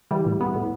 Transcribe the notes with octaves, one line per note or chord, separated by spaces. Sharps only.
E3 G3
A2
A2 B3
A2